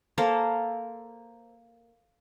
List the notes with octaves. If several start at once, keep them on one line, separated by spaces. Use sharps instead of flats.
A#3 A4 A#4 C5